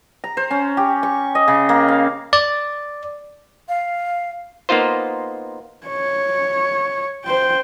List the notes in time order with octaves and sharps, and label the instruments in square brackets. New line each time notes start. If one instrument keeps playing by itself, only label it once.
[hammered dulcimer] A#5
C5
C#4
G4
C#6
D#5
C#3
A#3
F5
[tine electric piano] D5
[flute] F5
[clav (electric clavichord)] A#3 B3 D#4 F4 C5
[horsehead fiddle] C#5
C5 G5